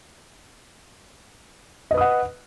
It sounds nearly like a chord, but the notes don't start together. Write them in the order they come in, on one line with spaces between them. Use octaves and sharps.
D#5 B4 D#6 F#5